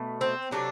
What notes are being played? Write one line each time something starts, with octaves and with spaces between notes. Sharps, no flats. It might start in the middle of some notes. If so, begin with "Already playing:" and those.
Already playing: B2 A3
C4
C3 F#3 A3 D4